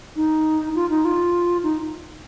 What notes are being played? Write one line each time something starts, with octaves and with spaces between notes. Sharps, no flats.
D#4
F4
D#4
F4
D#4